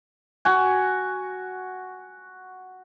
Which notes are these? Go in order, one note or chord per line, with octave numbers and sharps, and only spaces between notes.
F#4 G#5